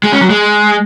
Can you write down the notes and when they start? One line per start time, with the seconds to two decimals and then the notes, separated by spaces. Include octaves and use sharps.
0.04 G#3
0.12 C#4
0.21 F#3
0.30 G#3